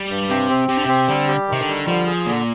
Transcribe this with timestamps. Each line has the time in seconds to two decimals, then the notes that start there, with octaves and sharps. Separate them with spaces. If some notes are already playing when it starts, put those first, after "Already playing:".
Already playing: G3
0.10 G2
0.29 C3 G4
0.50 C4
0.68 C3 G4
0.77 D3
0.83 C3 C4
1.08 D3 G3
1.28 G4
1.48 C3 D#3
1.61 D3
1.68 G3
1.87 D3 F3
2.07 G#4
2.26 A#2 D3